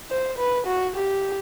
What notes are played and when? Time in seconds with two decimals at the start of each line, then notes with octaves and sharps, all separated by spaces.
0.11 C5
0.38 B4
0.67 F#4
0.96 G4